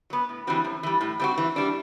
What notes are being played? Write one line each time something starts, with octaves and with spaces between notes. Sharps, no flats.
F#3 B3
A2
E3 G3 C4 F#4
F#2
E3 G3
A2
G3 C4 F#4
E3
G3 D4